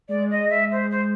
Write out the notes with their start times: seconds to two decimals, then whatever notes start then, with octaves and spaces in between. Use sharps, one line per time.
0.08 G#3 D5
0.30 D#5
0.50 E5
0.71 C5
0.90 C5